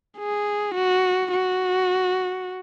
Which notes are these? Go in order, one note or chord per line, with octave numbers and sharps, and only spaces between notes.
G#4
F#4
F#4